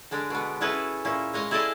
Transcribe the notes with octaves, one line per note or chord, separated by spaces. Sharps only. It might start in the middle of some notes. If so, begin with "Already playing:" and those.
D3 G#3 D4
B2 B3
C#4 E4 F#4 G#4 A4 B4
A#2 C#4 E4
G#3 C#5 D#5 F5
E4 G#4 A4 D5 D#5 F5